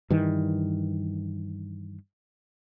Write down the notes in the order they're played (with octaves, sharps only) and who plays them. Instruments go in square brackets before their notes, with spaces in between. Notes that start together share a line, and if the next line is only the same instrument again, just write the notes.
[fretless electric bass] G2 D#3 E3